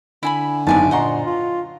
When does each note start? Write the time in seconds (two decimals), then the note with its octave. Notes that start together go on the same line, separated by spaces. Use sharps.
0.23 D3 E4 G#5 B5
0.67 F#1 D#2 G#2 B3 D5 G#5 A5
0.91 A#2 C5 D#5 F#5 A#5 C6 C#6
1.25 F4